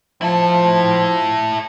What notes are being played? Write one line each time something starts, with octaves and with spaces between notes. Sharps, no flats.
F3 E4 A4